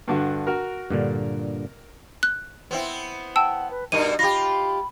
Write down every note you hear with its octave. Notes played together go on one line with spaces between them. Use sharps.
G2 D3 F#4
F#4 A#4
G2 A#2 D3
F#6
B3 C4 E4
F#5 G5 A5 E6
B4
G2 B2 D#4 A#4 D#7
F4 G4 B5 A#6